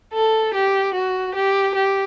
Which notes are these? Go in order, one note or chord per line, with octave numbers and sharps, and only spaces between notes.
A4
G4
F#4
G4
G4